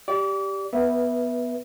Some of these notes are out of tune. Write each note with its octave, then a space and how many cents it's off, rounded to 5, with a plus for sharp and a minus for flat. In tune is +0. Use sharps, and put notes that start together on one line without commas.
G4 +0 D5 -10 D6 -35
B3 +0 B4 -20 E5 +0